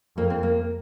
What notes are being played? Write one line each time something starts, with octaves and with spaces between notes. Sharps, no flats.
F2 A#3
C4
A#3